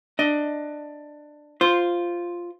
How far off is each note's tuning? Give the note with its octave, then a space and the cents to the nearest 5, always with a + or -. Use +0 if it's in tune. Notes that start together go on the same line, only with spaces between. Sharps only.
D4 +15 D#5 +20
F4 +0 C5 +0